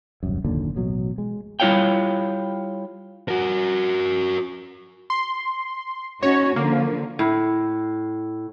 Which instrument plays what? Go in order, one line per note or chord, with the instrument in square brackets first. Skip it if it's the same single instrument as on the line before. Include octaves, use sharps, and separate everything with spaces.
[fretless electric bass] D#1 C2 F#2
F#1 D#2 A#2 D3
A1 B2 F#3
G#3
[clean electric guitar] G3 E4 F4 C#5 F5 G5
[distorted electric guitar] F#4 A#4
[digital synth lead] C6
[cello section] C#4 D#4 F#4 [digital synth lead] C#5
[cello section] D3 F3 [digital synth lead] A#3
[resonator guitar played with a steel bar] A2